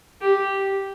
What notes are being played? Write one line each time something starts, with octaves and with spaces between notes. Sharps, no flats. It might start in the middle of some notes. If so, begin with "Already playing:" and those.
G4